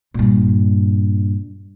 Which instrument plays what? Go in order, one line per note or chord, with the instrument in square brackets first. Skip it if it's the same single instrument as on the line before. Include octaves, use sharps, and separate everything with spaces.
[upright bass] G2 A#2